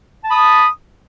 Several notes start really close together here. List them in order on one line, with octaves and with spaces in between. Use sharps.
A5 B5 D#6